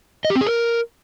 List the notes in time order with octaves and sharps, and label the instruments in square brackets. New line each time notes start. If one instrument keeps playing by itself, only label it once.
[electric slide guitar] D#5
G4
C4
G#4
A#4